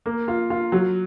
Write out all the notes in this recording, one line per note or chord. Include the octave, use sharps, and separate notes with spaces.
A#3
F4
F4
F#3